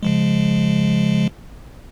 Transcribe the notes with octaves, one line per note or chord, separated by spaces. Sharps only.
C#3 F3 G#3